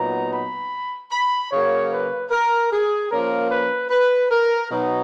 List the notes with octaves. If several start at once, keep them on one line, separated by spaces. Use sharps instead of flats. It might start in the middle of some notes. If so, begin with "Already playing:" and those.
Already playing: A#2 F#3 B3 D#4 A#5
B5
B5
C#3 F#3 A#3 C#5
B4
A#4
G#4
F3 A#3 C#4 A#4
B4
B4
A#4
B2 F#3 B3 D#4